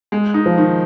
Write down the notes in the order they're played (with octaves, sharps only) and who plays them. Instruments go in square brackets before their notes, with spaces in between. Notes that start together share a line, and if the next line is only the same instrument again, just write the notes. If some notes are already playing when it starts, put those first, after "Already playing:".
[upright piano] G#3
D#4
[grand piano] F3
[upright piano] D#3